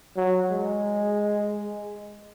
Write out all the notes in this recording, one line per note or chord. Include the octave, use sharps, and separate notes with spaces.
F#3
G#3